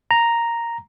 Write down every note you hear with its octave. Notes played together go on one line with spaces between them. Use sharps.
A#5